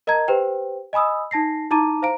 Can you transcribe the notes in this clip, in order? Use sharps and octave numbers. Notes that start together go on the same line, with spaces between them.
A#4 D#5 A5 A#5 G#6
G4 B4 C5 G5
D#5 G#5 B5 D#6 E6
D#4 A5 A#6 C7
D#4 E4 A5 A#5 D6 D#7
C5 F5 A#5 D7